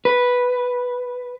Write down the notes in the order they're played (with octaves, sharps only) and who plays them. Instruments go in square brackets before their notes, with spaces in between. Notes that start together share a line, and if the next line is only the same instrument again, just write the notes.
[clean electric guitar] B4